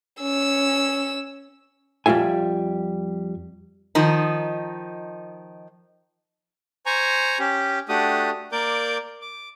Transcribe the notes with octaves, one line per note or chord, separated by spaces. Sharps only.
C#4 E6
F2 G3 F4 E5 G#5
D#3 F3 D#4
C5 G#5 A#5 C#6
C#4 G4
A3 D4 F#4 G4 D#6
A#3 A#4 D5 D6 G6
D6